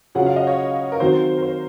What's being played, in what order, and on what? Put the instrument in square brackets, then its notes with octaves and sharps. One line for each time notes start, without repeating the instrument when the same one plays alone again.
[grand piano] C#3 F#3 C#4 F4 [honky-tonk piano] F#5
[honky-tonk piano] F5
D#5
C#5
A#4
[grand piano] D#3 F#3 C4 [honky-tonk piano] C5
[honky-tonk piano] A#4
C5